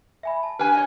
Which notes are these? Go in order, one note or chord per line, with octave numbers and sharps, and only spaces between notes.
E5 G#5 B5
A5
D4 G4 B4 G#5 F6
C#5 D#5 G#5